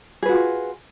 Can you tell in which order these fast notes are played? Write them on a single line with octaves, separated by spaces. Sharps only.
G#4 B4 F#4 F4